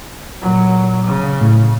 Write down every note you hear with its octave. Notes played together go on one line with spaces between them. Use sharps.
A#2 F#3
C#3
A2